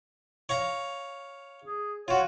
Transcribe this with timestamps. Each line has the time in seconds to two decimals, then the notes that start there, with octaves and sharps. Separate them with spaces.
0.49 C#5 F5 A#5
1.64 G#4
2.08 F4 F#4 C#5